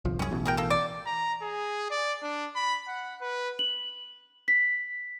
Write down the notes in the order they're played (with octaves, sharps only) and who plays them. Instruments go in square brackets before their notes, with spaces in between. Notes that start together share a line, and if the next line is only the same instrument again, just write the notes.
[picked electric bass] G1 C2 F3
[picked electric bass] C2 F#2 [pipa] C#4 G#4
[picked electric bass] A1 B2 E3
[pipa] G#4 A#4 G5
A#3 A4
D5
[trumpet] A#5
G#4
D5
D4
B5
F#5
B4
[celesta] F#7
B6